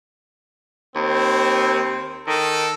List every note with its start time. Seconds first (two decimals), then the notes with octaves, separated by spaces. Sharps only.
0.95 D#2 C4
2.27 D#3 A4